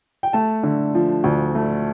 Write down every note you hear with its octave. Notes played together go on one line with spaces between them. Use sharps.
G5
A3 A5
D3
F3
D2
A3